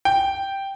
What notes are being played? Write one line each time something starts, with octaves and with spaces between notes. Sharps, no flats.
G5